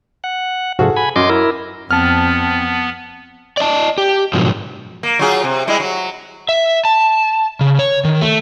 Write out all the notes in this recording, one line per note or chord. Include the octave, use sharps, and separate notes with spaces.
F#5
G#2 C3 F3 F#4 G#4 A4
G#5 B5
F#2 D#5 C6 D6
E4 A#4
F2 B3 C4 A5 F6
D5 D#5 A5
G4
G#2 B2 D3 F3 F#3
A#3
F#3 F4 G#4
C3
G3 G#3 E4
F#3
E5
A5
C#3
C#5
D#3
A3